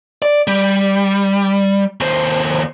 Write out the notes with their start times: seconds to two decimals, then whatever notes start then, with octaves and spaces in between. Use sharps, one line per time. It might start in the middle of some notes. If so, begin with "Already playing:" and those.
0.22 D5
0.47 G3
2.01 D#2 C5